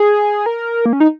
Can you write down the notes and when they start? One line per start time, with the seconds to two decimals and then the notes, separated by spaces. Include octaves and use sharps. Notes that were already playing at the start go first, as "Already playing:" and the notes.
Already playing: G#4
0.46 A#4
0.86 A#3
0.93 C#4
1.00 D#4